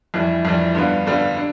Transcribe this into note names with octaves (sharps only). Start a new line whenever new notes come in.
F2 E3 G3
F2 E3 G3
G2 D3 G3 B3 F4
G2 D3 G3 B3 F4
D4